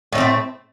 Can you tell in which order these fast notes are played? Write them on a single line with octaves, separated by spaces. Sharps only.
A2 D#3 C4 A3